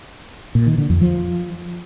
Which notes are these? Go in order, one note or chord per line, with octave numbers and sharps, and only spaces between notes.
A#2
D#3
D3
F2
F3